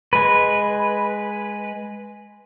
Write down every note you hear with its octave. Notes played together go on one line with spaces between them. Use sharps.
G#3 B4